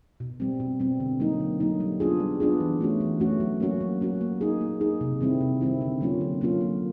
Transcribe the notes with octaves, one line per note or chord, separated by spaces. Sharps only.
B2
G3 C4
B2
G3 C4
D3
F#3 A#3 D#4
D3
F#3 A#3 D#4
G3
B3 D4 F4 G#4
G3
B3 D4 F4 G#4
E3
A3 C#4 F#4
E3
A3 C#4 F#4
F#3
A#3 C#4 F#4
F#3
A#3 C#4 F#4
A#3
D#4 G#4
A#3
D#4 G#4
C3
D#3 G3 C4 E4
C3
D#3 G3 C4 E4
D3
F#3 A#3 C#4 F4
D3
F#3 A#3 C#4 F4
A#3